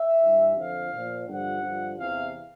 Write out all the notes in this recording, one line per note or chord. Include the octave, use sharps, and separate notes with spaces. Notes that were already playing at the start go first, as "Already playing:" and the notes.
Already playing: E5
G2 E3
F2 D3 F3 F5
A#2 F3
G2 D3 F3 F#5
G2 D3 F3
E2 C3 E3 F5